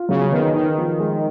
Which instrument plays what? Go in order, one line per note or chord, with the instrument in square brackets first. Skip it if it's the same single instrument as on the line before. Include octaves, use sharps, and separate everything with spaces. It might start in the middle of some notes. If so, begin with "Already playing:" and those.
Already playing: [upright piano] F4
[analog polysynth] C#3 [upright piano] F#3
[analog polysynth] D#3 [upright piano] B3
[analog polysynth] D#3 [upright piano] D#4
[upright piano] F3
G#3